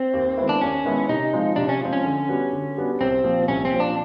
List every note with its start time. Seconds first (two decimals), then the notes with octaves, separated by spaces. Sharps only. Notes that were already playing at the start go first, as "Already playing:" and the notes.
Already playing: C4
0.13 D#2
0.37 D#3 G#3 B3 E4
0.49 D4
0.61 D#2 C#4
0.85 D#3 G#3 B3 E4
1.09 C3 D#4
1.33 F3 G#3 C4
1.56 C3 D4
1.69 C#4
1.81 F3 G#3 C4
1.93 C#4
2.05 D3
2.28 G3 B3 D4 F#4
2.53 D3
2.77 G3 B3 D4 F#4
3.01 C2 C4
3.24 A#2 F3
3.48 C2 C#4
3.65 C4
3.73 A#2 F3
3.80 D4